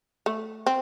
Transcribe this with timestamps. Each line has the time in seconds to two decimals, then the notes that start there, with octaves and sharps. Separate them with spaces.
0.26 A3
0.66 C4